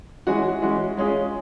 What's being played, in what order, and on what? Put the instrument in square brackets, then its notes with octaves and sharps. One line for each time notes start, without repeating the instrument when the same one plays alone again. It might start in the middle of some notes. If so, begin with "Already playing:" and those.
[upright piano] E3 G#3 C#4 F#4
E3 G#3 C#4 F#4
G#3 C#4 F4 G#4